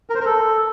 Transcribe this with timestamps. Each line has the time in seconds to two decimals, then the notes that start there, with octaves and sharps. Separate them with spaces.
0.10 A#4
0.15 C5
0.20 A#4
0.25 A4